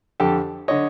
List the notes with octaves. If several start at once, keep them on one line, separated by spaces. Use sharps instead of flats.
F2 D3 G4 A4
D3 C#5 D#5